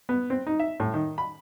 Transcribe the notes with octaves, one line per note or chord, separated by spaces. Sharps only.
B3
C4
D#4
E5
A2
D#3
B5